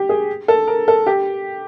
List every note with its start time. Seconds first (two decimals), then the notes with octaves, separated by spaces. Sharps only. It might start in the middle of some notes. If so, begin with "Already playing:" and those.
Already playing: G4
0.09 G#4
0.48 A4
0.67 A#4
0.88 A4
1.06 G4